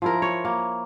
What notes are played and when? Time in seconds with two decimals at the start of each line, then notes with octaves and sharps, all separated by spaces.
0.02 F3 E4 A#4
0.22 C#5
0.45 A#3